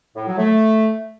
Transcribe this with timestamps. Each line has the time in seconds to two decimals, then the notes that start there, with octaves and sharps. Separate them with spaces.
0.16 A2
0.27 F#3
0.38 A3